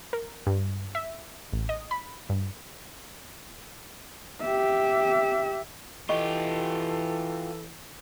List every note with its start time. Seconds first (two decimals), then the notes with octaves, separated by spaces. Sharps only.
0.13 A#4
0.47 G2
0.95 E5
1.52 A1
1.69 D#5
1.91 B5
2.29 G2
4.42 G4 E5
6.09 E3 F4 G4 A4 D#5 C#6